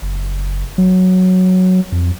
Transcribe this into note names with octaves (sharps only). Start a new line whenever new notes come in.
F#1
F#3
F2